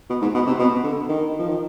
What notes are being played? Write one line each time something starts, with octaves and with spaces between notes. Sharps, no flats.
B2
G#2
B2
C3
B2
D3
D#3
F3
D#3